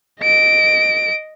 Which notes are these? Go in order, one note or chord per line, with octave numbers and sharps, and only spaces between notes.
D#5 D7